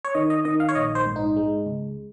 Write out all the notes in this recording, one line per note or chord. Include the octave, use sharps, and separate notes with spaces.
C#5
D#3 D#5
D#5
D#3 D#5
F5
C#5
A#1 D#5
C5
G#2
D#4
G#3
C#2